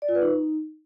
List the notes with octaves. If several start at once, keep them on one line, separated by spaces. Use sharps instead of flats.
D5
F4
B4
D#4